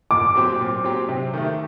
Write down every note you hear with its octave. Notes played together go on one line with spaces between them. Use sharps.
A#2 D6
F#3 C4 G4
A#2
F#3 C4 G4
C3
D#3 A3